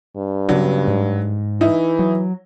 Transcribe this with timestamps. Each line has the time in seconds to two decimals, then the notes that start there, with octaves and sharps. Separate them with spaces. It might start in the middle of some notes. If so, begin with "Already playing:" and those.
0.17 G2
0.49 C#3 F#3 B3 D4
0.88 G#2
1.61 E3 D#4 E4
1.99 F#3